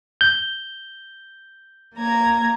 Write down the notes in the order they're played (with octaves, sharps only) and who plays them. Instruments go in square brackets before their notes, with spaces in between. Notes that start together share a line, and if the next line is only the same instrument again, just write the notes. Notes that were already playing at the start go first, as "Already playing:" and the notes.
[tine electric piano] G6
[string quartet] A#3 A#5 G#6